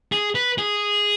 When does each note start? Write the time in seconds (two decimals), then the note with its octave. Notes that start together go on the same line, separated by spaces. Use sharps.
0.12 G#4
0.35 B4
0.58 G#4